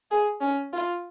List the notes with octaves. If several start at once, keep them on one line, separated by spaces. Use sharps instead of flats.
G#4
C#4
F4